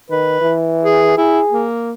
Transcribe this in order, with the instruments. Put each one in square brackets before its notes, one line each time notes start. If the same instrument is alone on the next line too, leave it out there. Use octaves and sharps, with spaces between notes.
[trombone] D#3 [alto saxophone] B4
[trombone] E3
[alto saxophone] G#4
[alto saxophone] E4 [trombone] G#4
[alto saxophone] A#3